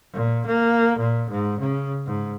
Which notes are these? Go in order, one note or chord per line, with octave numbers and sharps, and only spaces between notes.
A#2
A#3
A#2
G#2
C#3
G#2